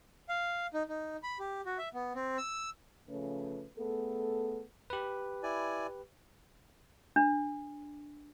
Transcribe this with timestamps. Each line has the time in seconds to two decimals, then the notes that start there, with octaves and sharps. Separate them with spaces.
0.29 F5
0.74 D#4
0.89 D#4
1.23 B5
1.39 G4
1.66 F#4
1.78 E5
1.94 B3
2.15 C4
2.38 E6
3.08 C#3 F3 A3 C#4 B4
3.77 A3 B3 G#4 A4
4.90 G4 B4
5.43 E4 D5 G#5
7.16 D4